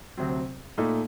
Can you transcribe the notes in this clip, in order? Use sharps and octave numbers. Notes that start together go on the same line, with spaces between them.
D2 C3 F#3 C4
A#2 A3 D#4 A4